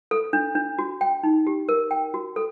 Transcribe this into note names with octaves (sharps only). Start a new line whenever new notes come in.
A4
D4
D4
F#4
G5
D#4
G4
A#4
G5
F#4
A4